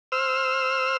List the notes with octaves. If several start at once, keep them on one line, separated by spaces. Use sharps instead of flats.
C5 E6 F6